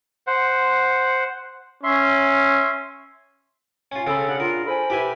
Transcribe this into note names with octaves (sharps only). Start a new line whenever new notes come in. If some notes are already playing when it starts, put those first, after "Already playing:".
C5 F#5
C#4 E5 C6
C#4 F4 G#5
C#3 C4 C#4 A4 B5 F6
D4 G#4 F#5
F4 A#4
A4 C5 G#5 B5
E4 G4 B4 E5 G5 G#5